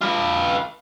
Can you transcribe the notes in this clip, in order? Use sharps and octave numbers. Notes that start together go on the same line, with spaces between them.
F4 B4